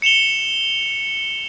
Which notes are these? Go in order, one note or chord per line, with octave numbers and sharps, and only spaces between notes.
C#7 E7 F7 G7